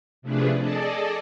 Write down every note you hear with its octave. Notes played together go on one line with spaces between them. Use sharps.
C3 F3 A3 D4 G#4 B4
G#4 A4 D5 D#5 A5